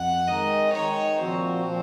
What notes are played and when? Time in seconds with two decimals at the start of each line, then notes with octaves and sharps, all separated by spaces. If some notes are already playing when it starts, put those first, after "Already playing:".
Already playing: F2 F#5
0.28 D#3 G#3 D#4 D#5
0.73 D#3 G#3 D#4 C#5
1.19 A#2 F3 C4 F#4 C5
1.65 A#2 F3 C4